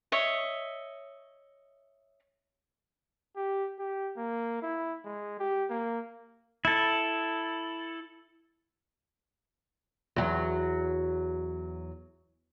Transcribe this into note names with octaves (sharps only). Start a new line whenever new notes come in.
C#5 D#5 E5
G4
G4
A#3
E4
G#3
G4
A#3
E4 A4
E2 F#3